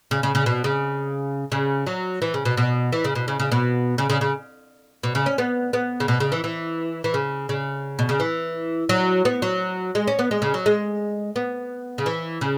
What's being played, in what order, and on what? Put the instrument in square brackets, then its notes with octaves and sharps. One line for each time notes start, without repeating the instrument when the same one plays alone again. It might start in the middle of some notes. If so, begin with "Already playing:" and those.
[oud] C#3
C#3
C#3
B2
C#3
C#3
F#3
E3
C#3
B2
B2
E3
C#3
B2
C#3
C#3
B2
C#3
C#3
C#3
B2
C#3
C#4
B3
B3
C#3
B2
C#3
E3
E3
E3
C#3
C#3
B2
C#3
E3
F#3
B3
F#3
G#3
C#4
B3
G#3
C#3
F#3
G#3
B3
C#3
E3
C#3